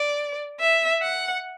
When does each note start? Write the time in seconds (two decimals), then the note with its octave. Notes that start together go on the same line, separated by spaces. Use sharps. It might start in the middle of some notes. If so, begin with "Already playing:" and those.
Already playing: D5
0.60 E5
1.02 F#5